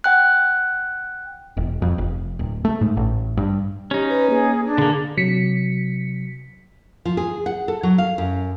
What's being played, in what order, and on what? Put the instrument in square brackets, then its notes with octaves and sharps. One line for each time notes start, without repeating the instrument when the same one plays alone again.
[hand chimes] F#5 G5 F#6
[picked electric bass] E1
F2
F1
D1
A3
G#2
A1
G2
[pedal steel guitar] C#4 D#4 [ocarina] G4
[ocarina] B4
[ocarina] A#3 [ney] G#4
[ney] D4
[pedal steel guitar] D3 A#3 [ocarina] G#4
[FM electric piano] C3 F#3 B6 C#7
[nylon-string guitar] F3
G#4
F#5
A4
F#3
F5
F#2